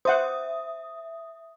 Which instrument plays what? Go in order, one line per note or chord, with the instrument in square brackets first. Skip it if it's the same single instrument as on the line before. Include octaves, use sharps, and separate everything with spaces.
[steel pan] C5 F#5 [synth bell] E5 D#6